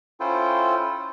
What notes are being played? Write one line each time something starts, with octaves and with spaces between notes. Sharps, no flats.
C#4 E4 F4 A4 C5 G5